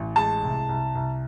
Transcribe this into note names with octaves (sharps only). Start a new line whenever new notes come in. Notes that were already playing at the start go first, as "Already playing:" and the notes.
Already playing: A1
G#3 A5
C2
C2
C2